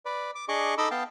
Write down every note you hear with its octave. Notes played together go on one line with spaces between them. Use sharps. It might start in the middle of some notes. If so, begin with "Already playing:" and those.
B4 D5
D6
D4 G#4 D#5 C#6 D6
D#4 A4 D#5 B5 D6 E6
B3 F5 G5 A5